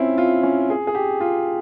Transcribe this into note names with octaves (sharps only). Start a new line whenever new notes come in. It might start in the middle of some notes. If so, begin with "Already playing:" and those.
Already playing: C4 C#4 E4 F4
F4
C#4
G#4
G#4
G4
F4